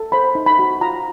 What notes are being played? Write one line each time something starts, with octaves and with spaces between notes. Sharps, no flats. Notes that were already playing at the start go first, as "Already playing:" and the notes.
Already playing: A4
C5 B5
D#4
B5
F#4
F4 A#5